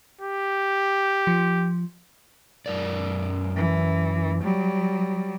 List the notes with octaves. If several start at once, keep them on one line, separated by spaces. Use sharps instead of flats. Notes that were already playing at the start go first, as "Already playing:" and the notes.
G4
F3
F#2 A#4 D5
E3
F#3 G3